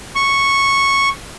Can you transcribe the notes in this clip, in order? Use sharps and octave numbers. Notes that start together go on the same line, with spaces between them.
C#6